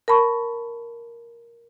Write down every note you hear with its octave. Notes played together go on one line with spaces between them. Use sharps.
A#4 A5 B5 C#6